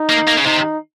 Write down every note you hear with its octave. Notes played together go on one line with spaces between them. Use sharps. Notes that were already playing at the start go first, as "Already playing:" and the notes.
Already playing: D#4
A#3
A#3
C#3
C3 D#4